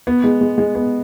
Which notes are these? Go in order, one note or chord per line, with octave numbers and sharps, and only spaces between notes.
B3
G#3
G#3
G#3
B3